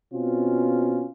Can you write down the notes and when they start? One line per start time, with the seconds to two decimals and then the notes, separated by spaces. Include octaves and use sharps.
0.12 B2 C4 C#4 F4